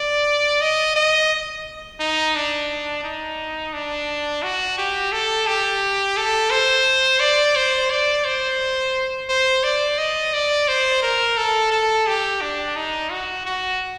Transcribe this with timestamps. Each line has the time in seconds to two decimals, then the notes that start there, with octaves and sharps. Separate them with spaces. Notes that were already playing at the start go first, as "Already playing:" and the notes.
Already playing: D5
0.61 D#5
0.96 D#5
2.00 D#4
2.35 D4
3.04 D#4
3.73 D4
4.43 F#4
4.78 G4
5.13 A4
5.47 G4
6.17 A4
6.51 C5
7.20 D5
7.56 C5
7.91 D5
8.25 C5
9.29 C5
9.63 D5
9.98 D#5
10.34 D5
10.68 C5
11.03 A#4
11.37 A4
11.72 A4
12.07 G4
12.42 D4
12.76 D#4
13.11 F#4
13.46 F#4